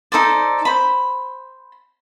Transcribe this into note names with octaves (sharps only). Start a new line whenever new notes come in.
D#4 A4 C5 D5
C5 B5